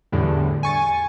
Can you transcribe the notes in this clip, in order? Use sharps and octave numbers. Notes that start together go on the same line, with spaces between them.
E2 A2 D3 G3
G#5 C#6 A6